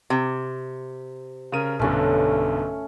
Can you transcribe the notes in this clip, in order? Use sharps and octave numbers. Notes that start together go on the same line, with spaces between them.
C3
C#3 A#4 D#7
B1 G2 D3 A3 C#4